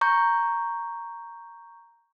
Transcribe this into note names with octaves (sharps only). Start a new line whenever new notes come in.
A#5 C#6 G6